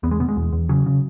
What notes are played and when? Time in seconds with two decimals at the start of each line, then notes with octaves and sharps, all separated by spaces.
0.03 E2 B3
0.11 G#3
0.20 B2 B3
0.29 G#3
0.37 E2
0.53 E2
0.69 C#3 F#3
0.86 C#3